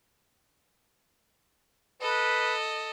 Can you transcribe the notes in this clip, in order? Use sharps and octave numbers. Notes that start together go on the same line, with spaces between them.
A4 B4 D#5